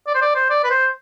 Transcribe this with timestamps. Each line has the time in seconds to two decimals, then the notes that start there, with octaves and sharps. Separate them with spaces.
0.07 D5
0.15 C5
0.21 D5
0.35 C5
0.50 D5
0.64 B4
0.71 C5